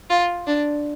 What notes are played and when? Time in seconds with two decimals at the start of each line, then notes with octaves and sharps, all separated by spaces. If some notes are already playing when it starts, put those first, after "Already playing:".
0.10 F4
0.46 D4